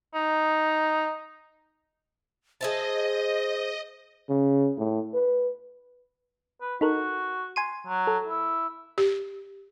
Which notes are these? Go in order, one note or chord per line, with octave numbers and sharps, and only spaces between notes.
D#4
G#4 C5 D#5 E5 A5
C#3
A2
B4
B4
D#4 F#4 A4 A#4
G#5 C6 D#7
F#3
A4
E4
G4